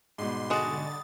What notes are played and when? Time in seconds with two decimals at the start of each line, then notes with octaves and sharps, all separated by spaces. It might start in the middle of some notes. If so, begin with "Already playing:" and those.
0.18 G#2 B2 G3 C6
0.50 D3 G#3 F#4 D#5 A6